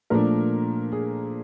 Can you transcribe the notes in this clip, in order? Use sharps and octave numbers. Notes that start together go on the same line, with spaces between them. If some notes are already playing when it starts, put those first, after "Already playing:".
A#2 F3 A3 D4 A#4
G#4